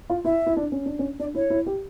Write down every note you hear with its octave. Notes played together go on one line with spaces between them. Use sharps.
F4
E4 E5
E4
D4
C#4
D4
C#4
D4 D5
E4 C#5
E4
G4